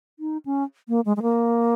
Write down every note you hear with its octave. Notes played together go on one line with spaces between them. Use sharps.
D#4
C#4
A#3
G#3
G#3
A#3